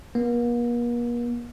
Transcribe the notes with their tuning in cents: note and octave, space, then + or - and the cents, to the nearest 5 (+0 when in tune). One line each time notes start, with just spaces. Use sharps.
A#3 +45